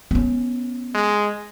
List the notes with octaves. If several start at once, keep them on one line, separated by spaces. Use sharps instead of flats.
B3 C#4
G#3